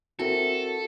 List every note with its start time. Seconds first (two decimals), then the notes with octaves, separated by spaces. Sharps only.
0.19 C4 E4 F#4 A4 A#4